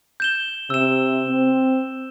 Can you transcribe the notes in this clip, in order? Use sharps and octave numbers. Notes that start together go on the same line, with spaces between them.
G6 E7 G7
C3 E6 E7
C4